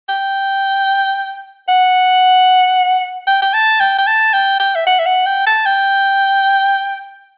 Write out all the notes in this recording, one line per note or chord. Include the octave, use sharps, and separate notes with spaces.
G5
F#5
G5
G5
A5
G5
G5
A5
G5
G5
E5
F#5
E5
F#5
G5
A5
G5